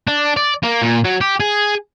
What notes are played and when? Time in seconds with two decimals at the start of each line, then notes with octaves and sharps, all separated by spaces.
0.07 D4
0.37 D5
0.63 A#3
0.82 A#2
1.05 F#3
1.21 G4
1.40 G#4